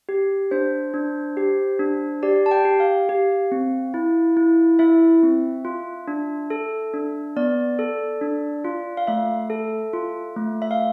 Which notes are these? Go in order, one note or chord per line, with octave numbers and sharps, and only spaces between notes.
G4
D4 C5
D4
G4
D4
G4 D5
A5
G5
G4
F5
G4
C4
E4
E4
E4 E5
C4
F4
D4
A4
D4
B3 D5
A4
D4
F4
F5
A3 E5
A4
F4
A3
E5
F5